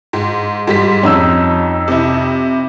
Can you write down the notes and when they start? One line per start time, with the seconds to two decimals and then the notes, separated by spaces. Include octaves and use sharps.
0.13 G#2
0.67 G#2 G3 B6
1.03 F2 C#4 D#4 E6
1.88 C3 E4